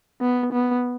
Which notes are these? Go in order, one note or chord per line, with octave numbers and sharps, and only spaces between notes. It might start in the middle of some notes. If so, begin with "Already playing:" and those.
B3
B3